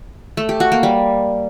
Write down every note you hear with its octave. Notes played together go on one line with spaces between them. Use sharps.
A3
G4
F#4
A#3
G3